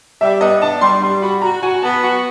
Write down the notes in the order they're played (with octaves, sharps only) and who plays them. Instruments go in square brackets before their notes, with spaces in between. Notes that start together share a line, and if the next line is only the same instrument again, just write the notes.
[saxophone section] G3 [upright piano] E5
[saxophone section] B3 [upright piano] D#5
[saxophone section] D4 [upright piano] A5
[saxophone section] G3 [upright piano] C6
[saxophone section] G3 [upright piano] C6
[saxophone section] F#4 [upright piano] B5
[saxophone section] F#4 [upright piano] A#5
[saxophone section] F#4 [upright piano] G#5
[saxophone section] B3 [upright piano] A5
[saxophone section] F#4